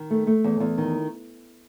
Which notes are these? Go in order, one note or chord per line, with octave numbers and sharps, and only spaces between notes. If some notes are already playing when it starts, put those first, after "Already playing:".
Already playing: D#3
A3
A3
E2
E2
D#3